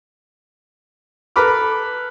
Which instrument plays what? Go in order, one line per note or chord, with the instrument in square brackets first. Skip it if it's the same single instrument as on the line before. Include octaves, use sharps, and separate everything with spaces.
[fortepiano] A4 B4 A#5 B5 D6 F6